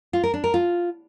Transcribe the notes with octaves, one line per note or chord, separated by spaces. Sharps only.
F4
A#4
D4
A#4
F4